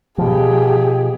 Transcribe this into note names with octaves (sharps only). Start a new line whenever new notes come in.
B2 F3 G4 G#4